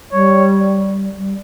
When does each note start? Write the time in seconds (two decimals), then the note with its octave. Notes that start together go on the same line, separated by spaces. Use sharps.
0.13 G3 C#5
1.18 G3